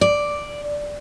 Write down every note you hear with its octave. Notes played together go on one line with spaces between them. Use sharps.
D5